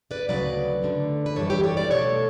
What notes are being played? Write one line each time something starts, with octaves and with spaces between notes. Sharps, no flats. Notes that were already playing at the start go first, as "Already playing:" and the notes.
B4 D5
D2 C#3 F#3 B4 D5
E2 D3 A3
B4
F#2 C#3 E3 G3 A4 C#5
G4 B4
A4 C#5
B4 D5
B2 A3 A4 C#5